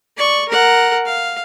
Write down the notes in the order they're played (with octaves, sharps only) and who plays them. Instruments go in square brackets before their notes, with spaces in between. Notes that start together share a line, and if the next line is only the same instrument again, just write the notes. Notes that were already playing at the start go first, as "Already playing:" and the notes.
[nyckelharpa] D5 C#6
A#4 F#5
F5